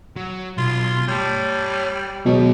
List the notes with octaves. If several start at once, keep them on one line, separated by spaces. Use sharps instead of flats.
F#3
B1 F4
G3 C#5 A5
D#2 B2 F#3 G#3 C#5